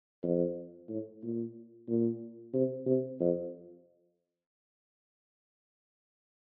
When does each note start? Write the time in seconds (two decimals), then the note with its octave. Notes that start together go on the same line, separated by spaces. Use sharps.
0.24 F2
0.89 A2
1.23 A#2
1.89 A#2
2.54 C3
2.86 C3
3.20 F2